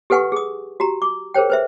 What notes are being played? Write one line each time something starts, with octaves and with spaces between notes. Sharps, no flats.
G4 A4 B4 F#5 G#5 C#6
G#4 D#6
F#4 G4 A#5
D6
G#4 A#4 C5 C#5 G5
B4 C5 E5